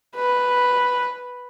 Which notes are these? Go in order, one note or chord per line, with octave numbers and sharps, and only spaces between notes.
B4